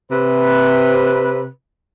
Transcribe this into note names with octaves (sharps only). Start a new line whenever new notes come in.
C3 B4